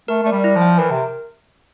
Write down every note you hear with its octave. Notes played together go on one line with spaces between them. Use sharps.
A3 A#4
A3 D5
G3
E4
F3
G5
E3 A#4
C3